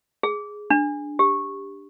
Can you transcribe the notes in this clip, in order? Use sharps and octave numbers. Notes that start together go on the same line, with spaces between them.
G#4
D4
G4